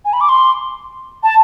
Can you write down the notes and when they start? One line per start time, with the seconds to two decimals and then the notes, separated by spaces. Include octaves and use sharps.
0.05 G#5
0.13 B5
0.21 D6
0.29 C6
1.23 A5